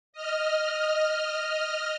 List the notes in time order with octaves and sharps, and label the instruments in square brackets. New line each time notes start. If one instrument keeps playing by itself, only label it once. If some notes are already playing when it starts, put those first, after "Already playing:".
[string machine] D#5 F6